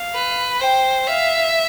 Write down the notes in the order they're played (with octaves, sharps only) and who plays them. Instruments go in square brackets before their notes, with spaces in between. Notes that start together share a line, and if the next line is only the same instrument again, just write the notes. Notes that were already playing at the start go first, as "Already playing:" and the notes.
Already playing: [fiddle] F5
[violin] B4
[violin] C5 [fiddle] G5
[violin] E5 [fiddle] F5